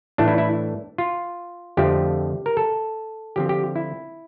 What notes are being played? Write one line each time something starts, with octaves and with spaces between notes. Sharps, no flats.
A2 E3 A3 D4
E4
E4
F4
F2 D3 F3 A3 C4 G4
A#4
A4
D3 F3 C4 G4
G4
E4